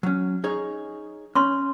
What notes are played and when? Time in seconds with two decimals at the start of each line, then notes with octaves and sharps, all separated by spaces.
0.03 F#3 C#4
0.44 D#4 G#4 C#5
1.35 C#4 C#5 C6 C#6